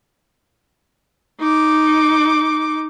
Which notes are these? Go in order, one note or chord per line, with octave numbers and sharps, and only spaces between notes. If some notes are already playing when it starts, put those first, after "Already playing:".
D#4 D6